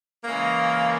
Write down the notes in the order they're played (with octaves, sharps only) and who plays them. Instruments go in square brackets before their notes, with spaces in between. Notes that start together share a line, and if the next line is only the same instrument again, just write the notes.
[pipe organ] C#3 E3 G#3 C#4 [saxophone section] A#3